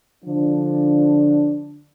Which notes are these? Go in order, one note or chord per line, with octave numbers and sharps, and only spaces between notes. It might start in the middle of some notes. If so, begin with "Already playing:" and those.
D3 F3 D4